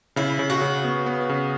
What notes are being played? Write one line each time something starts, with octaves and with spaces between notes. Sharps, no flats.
C#3 E4
C#3
F#4
C#3
B3
B3
C#3